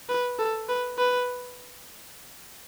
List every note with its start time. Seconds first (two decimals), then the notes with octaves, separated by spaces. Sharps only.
0.09 B4
0.39 A4
0.69 B4
0.98 B4